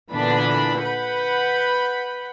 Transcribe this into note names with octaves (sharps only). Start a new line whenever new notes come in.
A#2 D3 E3 B3 D4 B5
B4 F#5 B5 G6